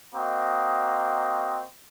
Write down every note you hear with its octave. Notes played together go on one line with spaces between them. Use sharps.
A#3 C4 F#4 D#5